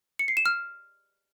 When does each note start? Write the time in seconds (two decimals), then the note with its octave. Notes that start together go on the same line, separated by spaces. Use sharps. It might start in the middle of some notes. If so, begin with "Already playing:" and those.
0.19 C#7
0.28 C7
0.37 E7
0.46 F6